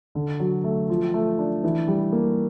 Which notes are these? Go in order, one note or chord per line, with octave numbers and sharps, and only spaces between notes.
D3
F#3
A3
F3
A3
D4
E3
G3
A#3